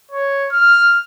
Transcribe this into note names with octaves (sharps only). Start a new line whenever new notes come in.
C#5
F6